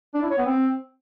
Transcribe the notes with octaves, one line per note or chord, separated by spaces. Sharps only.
D4
E4
C#5
B3
C4